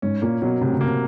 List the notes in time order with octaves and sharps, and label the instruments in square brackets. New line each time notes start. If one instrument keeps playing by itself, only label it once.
[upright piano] G#2 [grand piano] C#4
[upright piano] A#2 [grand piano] A#3
[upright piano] B2 [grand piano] F#3
[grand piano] A2 [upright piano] C3
[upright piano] C#3
[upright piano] C3 [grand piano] A#3